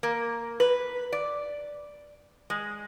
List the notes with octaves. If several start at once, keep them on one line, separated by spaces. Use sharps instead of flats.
A#3
B4
D5
G#3